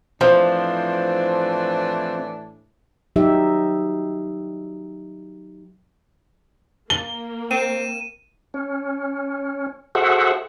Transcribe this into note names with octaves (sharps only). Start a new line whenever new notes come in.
A2 E3 F3 C4 D4 C5
F#3 D#4 G4 E5
A#3 G7
C4 D#7 E7
C#4
F#4 G#4 A4 C5 E5 F#5